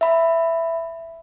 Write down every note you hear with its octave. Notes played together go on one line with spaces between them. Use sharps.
E5 B5